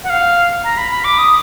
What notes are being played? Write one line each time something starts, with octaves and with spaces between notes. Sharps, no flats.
F#5
F5
A#5
B5
B5
D6
D#6